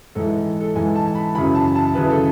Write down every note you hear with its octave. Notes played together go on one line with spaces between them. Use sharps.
G#2 E3 A4
A4
G#2 E3 G#5
A5
B5
F#2 C#3 E3 B5
A5
A5
F#2 C#3 E3 B4
A4